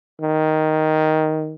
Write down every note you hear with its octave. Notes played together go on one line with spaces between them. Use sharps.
D#3